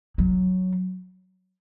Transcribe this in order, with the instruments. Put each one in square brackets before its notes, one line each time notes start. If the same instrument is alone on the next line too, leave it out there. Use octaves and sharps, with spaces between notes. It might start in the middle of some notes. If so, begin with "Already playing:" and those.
[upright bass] F#3